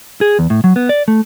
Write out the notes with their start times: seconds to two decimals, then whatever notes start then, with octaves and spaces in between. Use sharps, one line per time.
0.21 G#4
0.39 E2
0.50 A2
0.64 F#3
0.76 B3
0.89 D5
1.08 A3